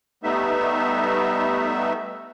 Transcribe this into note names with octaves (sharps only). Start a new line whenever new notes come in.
G3 A3 B3 D#4 E5